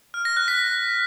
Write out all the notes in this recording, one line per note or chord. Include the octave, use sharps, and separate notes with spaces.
F6
A#6
F#6
B6